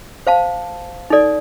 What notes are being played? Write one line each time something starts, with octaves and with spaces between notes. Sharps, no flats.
C5 F5 A5
D#4 A4 D5